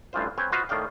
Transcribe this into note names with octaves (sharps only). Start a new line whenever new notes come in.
A1 G2 E3 F4 C5
C4 B4 C#5 G5 G#5
F4 F#4 B4 C5 D#5 F5
A2 D#3 D5 F5 G5